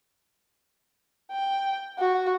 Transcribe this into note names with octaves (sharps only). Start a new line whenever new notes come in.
G5
F#4